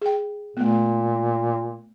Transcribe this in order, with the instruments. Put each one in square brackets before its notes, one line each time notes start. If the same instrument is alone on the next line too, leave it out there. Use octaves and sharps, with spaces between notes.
[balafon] G#4 G5
[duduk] A#2 [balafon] A3 B3